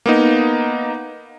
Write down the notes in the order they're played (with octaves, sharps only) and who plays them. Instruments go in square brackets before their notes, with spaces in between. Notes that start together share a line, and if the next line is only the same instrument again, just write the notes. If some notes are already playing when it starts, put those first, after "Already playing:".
[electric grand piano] A#3 B3 D#4